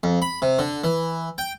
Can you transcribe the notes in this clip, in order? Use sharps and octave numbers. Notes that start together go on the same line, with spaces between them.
F2
B5
C3
D3
E3
G5